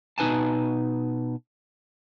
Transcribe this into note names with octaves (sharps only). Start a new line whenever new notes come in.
B2 D#4 B4 G#5 A5